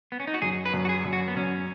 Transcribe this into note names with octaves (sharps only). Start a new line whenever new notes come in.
B3
C#4
D#4
F#4
F#2 G#4
B4
F#2
F#4
G#4
F#2
F#4
B3
F#2 C#4